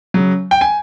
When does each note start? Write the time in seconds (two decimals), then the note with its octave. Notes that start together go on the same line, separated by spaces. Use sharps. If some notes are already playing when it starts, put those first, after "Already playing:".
0.14 C#3 F#3
0.51 G5
0.61 G#5